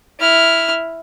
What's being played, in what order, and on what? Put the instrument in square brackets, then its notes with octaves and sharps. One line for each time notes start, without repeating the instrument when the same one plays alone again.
[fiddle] E4 F6